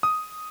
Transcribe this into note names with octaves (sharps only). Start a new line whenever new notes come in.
D#6